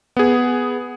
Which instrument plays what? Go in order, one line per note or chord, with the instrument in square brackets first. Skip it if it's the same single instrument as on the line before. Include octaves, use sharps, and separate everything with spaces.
[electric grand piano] B3 G#4